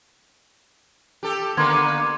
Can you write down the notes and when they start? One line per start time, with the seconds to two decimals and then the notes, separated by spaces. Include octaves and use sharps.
1.23 G4 A4
1.57 D3 A#3 B3 C6 G#6